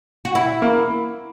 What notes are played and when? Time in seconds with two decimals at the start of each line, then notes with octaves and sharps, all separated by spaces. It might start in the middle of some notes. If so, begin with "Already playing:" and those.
0.25 F#4
0.35 E4
0.62 A#3